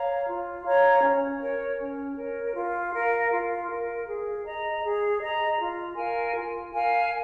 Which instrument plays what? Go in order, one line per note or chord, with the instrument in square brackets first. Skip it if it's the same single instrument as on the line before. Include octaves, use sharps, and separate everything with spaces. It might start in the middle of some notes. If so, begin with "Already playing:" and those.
Already playing: [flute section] C#5 F5 A#5
F4
C#5 F5 A#5
C#4
A#4 C#5
C#4
A#4 C#5
F4
A#4 F5
F4
A#4 F5
G#4
D#5 A#5
G#4
D#5 A#5
F4
A#4 F5 G#5
F4
A#4 F5 G#5